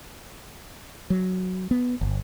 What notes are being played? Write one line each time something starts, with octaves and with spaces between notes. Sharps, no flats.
F#3
B3
G1